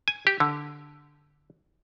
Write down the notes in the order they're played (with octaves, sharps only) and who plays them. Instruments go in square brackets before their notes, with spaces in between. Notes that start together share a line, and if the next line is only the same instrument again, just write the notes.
[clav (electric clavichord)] G#5
G4
D3